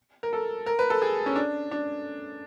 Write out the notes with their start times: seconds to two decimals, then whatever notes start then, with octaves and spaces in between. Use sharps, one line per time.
0.23 A#4
0.33 A4
0.66 A#4
0.79 B4
0.90 A4
1.02 G#4
1.26 C#4
1.36 D4
1.71 D4